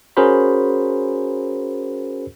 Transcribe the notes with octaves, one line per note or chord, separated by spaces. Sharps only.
C#4 F#4 G#4 A#4 C5 B5